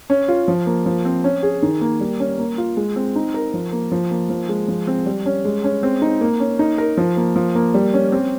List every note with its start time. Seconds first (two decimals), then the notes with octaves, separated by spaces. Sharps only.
0.10 C#4
0.28 F4
0.48 F3
0.66 A#3
0.86 F3
1.05 C4
1.24 C#4
1.43 G#4
1.62 D#3
1.81 A#3
2.01 G3
2.20 C#4
2.39 A#3
2.58 F4
2.77 G#3
2.96 C4
3.16 D#4
3.34 A#4
3.54 F3
3.73 A#3
3.92 F3
4.11 A#3
4.30 F3
4.49 G#3
4.68 F3
4.87 C4
5.06 G3
5.26 C#4
5.45 G#3
5.64 C#4
5.83 C4
6.02 D#4
6.21 A#3
6.40 C#4
6.59 D#4
6.78 A#4
6.97 F3
7.17 A#3
7.36 F3
7.55 A#3
7.74 G3
7.94 C#4
8.12 C4